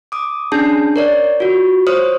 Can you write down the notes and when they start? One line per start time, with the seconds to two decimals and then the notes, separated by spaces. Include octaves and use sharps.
0.12 D6 D#6
0.52 C#4 D4 G#4 A5
0.96 A#4 C#5 D5
1.40 F4 F#4
1.87 C5 C#5 D#6 F6